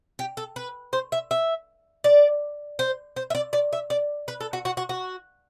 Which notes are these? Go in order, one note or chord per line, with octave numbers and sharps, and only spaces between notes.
G4
A4
B4
C5
E5
E5
D5
C5
C5
E5
D5
D5
E5
D5
B4
A4
F#4
F#4
F#4
F#4